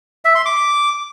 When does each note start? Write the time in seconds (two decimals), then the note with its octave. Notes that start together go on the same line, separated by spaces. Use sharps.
0.25 E5
0.35 C6
0.45 D6